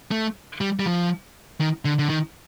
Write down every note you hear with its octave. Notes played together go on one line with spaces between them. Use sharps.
A3
G3
G3
F3
D#3
D3
D3
D#3